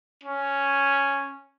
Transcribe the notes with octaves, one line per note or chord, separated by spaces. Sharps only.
C#4